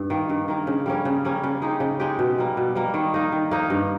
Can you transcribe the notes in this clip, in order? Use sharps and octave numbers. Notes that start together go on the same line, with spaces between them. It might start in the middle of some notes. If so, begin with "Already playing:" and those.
Already playing: G2
D#3 A#3
G2
D#3 A#3
C#3
G3 A#3 C#4
C#3
G3 A#3 C#4
C#3
G#3 D#4 G4
C#3
G#3 D#4 G4
B2
G3 A#3
B2
G3 A#3
D#3
A#3 D#4
D#3
A#3 D#4
G2